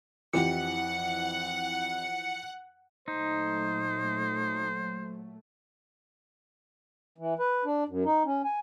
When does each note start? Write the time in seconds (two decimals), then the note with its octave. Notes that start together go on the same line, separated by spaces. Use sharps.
0.33 F2 E3 F3 G4 F#5 C#7
3.08 A#2 F#3 A3 D#4 C5
7.18 E3
7.39 B4
7.65 D4
7.88 F#2
8.05 D#4
8.26 C#4
8.44 G#5